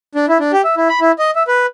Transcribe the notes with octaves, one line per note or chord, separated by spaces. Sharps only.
D4
E4
D4
G4
E5
E4
B5
E4
D#5
E5
B4